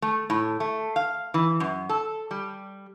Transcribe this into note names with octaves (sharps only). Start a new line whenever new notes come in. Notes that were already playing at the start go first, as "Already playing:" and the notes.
A3
A2
A3
F5
E3
F#2
A4
G3